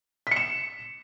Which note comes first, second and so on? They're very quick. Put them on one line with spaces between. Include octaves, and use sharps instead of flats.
B6 C#7 E7